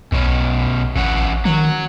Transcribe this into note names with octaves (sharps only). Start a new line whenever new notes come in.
B1 B2 C#4
A1 E3 C#4 F#5
D#3 F#3